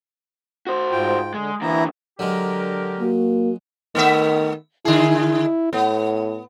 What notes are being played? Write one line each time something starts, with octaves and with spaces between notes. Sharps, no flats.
F#4 C5
G#2 F4 G5
D3 G#3
D3 E3 A#3 E4 A#5
D3 F#3 G#3 G4 A#4
A#3 F#4
D#3 A3 B3 E5
D3 E4 G#4
E4
A2 B3